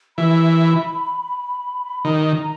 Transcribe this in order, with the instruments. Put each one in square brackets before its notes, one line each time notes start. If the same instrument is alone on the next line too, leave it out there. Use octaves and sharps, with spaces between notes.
[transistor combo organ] E3 [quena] B5
[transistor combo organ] D#3 [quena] A#5